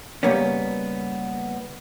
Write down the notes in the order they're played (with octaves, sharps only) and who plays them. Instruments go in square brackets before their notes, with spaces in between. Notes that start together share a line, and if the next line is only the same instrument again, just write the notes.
[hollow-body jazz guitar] C#3 G3 A#3 B3 C#4